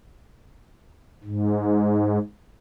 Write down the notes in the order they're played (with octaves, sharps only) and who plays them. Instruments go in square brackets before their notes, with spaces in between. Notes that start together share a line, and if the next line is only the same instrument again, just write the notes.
[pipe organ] G#2